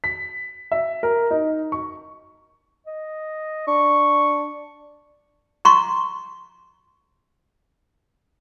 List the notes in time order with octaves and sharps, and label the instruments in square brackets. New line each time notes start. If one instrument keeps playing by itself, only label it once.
[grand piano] B6
E5
A#4
D#4
C#6
[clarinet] D#5
[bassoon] D4 [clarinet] C#6
[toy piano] A#5 C6 C#6